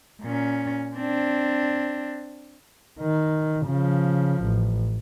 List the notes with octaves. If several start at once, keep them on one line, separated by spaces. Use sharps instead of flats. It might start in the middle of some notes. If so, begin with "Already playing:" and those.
A#2 C#4
C4 D4
D#3
C#3 F3
A1